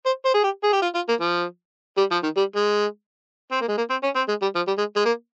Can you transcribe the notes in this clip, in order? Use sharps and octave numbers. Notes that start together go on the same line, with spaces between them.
C5
C5
G#4
G4
G#4
G4
F4
F4
A#3
F3
G3
F3
D#3
G3
G#3
C4
A#3
G#3
A#3
C4
C#4
C4
G#3
G3
F3
G3
G#3
G#3
A#3